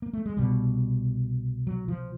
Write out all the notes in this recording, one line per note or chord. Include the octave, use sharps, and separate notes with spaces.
A#3
A3
G#3
C2 B2 G3
F#3
F3